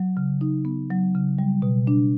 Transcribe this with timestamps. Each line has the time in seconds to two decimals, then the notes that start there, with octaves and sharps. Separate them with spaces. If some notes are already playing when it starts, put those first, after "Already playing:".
Already playing: F#3
0.17 C#3
0.41 D#4
0.65 B3
0.90 F#3
1.15 C#3
1.39 G3
1.62 B2
1.87 D4